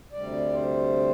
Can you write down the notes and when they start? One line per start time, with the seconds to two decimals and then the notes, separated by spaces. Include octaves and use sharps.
0.12 D2 C3 G3 D5
0.53 C5